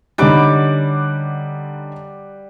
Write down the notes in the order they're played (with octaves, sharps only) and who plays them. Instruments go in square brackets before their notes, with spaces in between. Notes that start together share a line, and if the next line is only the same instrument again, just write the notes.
[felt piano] D3 C#4 D#4 [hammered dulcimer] G3 F#5 D6